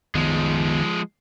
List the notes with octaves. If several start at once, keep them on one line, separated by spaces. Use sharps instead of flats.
D#3 F3 G#3 B3